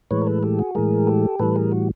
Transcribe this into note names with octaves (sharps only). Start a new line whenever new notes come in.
A2 E3 G#3 B4 C#5
A#4
A4 B4
G4 A4
F#4 G#4
A2 E3 G#3 G#4 A#4
G4 A4
A2 E3 G3 A4 B4
G#4 A#4
F#4